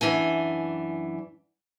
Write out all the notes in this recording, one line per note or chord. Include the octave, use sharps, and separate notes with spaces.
F#2 E3 D4 G#5